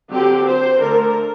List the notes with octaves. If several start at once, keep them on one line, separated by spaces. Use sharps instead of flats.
D3 F#3 C4 G4
C5
D3 A3 D4 A#4